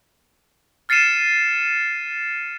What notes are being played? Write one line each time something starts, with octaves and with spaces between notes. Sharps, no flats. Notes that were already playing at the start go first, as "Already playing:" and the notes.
F6 A6 C7 C#7 D#7 E7